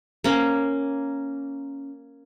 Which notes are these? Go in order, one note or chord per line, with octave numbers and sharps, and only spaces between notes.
A#3 C#4